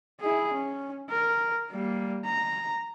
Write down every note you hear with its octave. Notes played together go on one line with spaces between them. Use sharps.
E4 G#4
C#4
A#4
G3 A#3
A#5